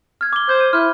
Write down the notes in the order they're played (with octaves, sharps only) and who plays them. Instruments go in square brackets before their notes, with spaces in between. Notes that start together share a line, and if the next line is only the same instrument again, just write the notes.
[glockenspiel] F6 G#6
D6 G7
[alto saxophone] C5 [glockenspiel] G6
[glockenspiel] D#7
[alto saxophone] E4 [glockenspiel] F6 G6